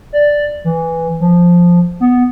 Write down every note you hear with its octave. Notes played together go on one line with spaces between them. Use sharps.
D5
E3
F3
B3